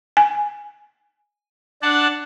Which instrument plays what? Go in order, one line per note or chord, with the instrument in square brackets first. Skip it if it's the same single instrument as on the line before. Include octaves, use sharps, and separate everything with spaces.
[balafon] G#5
[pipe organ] D4 F#5 A5